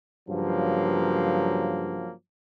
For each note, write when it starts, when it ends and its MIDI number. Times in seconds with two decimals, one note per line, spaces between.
0.29 2.13 43
0.29 2.13 49
0.29 2.13 53
0.29 2.13 54
0.29 2.13 58